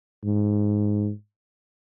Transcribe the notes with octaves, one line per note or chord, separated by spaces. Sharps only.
G#2